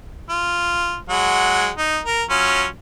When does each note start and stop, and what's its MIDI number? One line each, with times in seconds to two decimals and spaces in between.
0.30 0.97 65
1.09 1.71 54
1.09 1.71 56
1.09 1.71 78
1.78 1.99 63
2.04 2.23 70
2.30 2.66 54
2.30 2.66 61
2.30 2.66 65